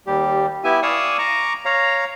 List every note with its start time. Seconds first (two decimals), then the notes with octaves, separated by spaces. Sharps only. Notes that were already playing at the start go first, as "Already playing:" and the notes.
0.07 D#2 G3 G4
0.64 B3 E4 G4 E5 G#5
0.83 D5 F5 G#5 C#6 D#6 E6
1.19 A#5 C#6 D6
1.65 C#5 F5 A#5